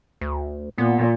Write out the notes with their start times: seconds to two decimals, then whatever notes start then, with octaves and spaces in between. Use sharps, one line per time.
0.21 D2
0.78 A#2 B3